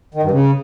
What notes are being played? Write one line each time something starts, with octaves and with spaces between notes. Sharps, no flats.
D#3
G2
C#3